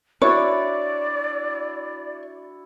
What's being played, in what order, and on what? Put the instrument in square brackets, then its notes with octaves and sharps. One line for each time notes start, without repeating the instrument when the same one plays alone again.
[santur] D4 E4 F#4 [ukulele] C#5 [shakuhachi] D5